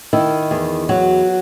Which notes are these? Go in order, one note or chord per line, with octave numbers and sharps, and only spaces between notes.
D#3 E4
E2
F#3 F#4